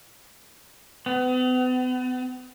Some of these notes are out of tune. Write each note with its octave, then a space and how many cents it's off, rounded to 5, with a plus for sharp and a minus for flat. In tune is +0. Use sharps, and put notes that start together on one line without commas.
B3 +40